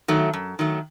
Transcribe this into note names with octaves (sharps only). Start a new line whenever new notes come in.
D#3 F#3 A3
F#2
D#3 F#3 A3